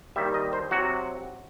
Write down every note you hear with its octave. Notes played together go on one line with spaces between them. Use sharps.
D#2 D#3 G3 E5
D#5
C5
C3 F#3 F#4